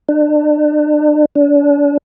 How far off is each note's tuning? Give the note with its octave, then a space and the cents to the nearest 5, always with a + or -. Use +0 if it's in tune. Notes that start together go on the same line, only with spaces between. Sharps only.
D4 +35
D4 -35